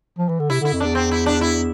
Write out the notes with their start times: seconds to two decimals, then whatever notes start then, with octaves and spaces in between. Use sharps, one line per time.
0.18 F3
0.29 E3
0.39 D3
0.50 C3 E4
0.61 D3 E4
0.73 F2
0.80 E2 D4
0.95 C4
1.11 E4
1.26 D4
1.41 E4